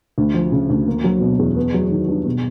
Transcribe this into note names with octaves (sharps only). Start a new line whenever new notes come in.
D2
F3
C#3
D2
A#3
F#3
B2
E2
B3
F#3
D#3
G2
B2